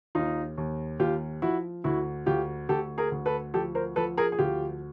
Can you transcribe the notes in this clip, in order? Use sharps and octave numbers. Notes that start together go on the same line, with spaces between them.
D#2 D#4 F4
D#2
D#2 F4 G4
F3 E4 F#4
D2 E4 F#4
D2 F4 G4
D2 G4 A4
G#4 A#4
D2
A4 B4
F3 G4 A4
A#4 C5
F3 A4 B4
G#4 A#4
G#4
D2 F4 G4